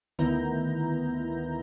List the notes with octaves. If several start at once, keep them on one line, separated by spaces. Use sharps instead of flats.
D2 D#3 B3 E4 A#5 G6